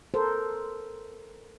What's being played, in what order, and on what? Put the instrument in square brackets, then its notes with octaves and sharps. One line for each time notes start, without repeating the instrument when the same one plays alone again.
[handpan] A4 A#4 C5